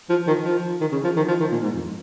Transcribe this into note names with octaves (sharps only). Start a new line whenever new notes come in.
F3
D#3
F3
D#3
C#3
F3
D#3
F3
D#3
A#2
G#2
F2